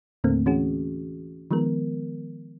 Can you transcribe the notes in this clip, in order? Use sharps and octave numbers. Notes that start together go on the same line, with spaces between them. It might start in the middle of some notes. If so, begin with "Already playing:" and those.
D#2 A2 D3 A3 A#3 C4
E3 C#4 F#4 G#4
D#3 F3 G#3 B3 A#4